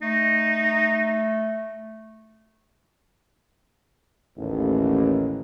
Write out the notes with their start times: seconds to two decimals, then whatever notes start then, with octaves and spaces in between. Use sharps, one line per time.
0.02 A3 D#4
4.38 A1 D#2